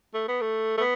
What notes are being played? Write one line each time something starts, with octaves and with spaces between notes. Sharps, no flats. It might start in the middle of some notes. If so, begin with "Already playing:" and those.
A3
B3
A3
A3
B3